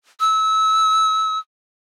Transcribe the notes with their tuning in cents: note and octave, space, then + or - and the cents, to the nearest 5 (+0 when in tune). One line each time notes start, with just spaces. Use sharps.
E6 -25